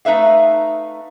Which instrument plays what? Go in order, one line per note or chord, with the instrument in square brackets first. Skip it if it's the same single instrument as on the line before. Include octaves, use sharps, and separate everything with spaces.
[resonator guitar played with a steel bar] A3 D#4 B4 E5 F5